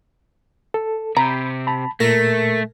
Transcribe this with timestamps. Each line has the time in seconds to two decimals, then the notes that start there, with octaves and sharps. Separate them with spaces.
0.74 A4
1.17 C3 A#5 B5 G6
1.67 A5 B5
2.00 A#2 A3 A#4